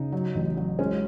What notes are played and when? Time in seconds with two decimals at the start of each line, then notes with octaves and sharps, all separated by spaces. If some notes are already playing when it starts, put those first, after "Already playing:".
Already playing: C#3 D#4
0.12 F#3
0.35 A1
0.57 F#3
0.79 G#3 C#4